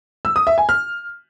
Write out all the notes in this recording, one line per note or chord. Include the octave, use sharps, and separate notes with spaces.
E6
D#6
E5
G#5
F6